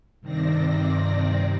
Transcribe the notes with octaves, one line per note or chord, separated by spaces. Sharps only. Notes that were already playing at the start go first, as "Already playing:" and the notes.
G2 C3 D#3 C4 D5 A#6